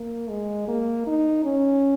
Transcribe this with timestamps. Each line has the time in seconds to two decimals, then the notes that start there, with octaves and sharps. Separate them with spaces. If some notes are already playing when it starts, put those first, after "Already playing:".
Already playing: A#3
0.30 G#3
0.68 A#3
1.07 D#4
1.44 C#4